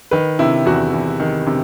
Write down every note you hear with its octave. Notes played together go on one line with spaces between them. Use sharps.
D#3 B4
C3 E4
E2 F#4
E2
D#3
C3